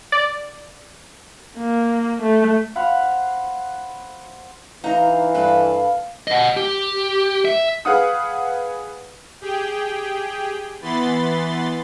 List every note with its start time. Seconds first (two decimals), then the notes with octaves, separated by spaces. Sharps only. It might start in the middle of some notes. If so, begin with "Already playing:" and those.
0.12 D5
1.58 A#3
2.22 A3
2.76 C5 F5 F#5 B5
4.84 E3 D#4 F5 A#5
5.34 G2 A4 B4
6.27 D#5 F#5
6.57 G4
7.45 E5
7.85 G#4 B4 F5 F#5 D#6
9.41 G4 G#4 G5
10.82 E3 B3 B5 C6 A6